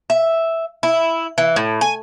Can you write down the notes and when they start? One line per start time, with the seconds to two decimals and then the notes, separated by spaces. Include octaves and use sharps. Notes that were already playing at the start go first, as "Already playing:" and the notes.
0.10 E5
0.83 E4
1.38 E3
1.56 A2
1.81 G#5